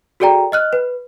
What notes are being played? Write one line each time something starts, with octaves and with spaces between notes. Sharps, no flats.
F#4 G#4 A4 D5 G5 A#5
D#5 F6 F#6
B4